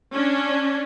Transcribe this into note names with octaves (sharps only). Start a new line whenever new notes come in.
C#4 D4